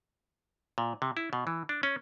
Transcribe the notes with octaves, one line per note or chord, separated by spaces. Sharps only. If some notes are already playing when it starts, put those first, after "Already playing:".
A#2
C3
E4
B2
E3
D4
C#4